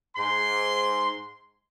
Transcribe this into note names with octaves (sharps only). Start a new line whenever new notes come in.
G#2 C6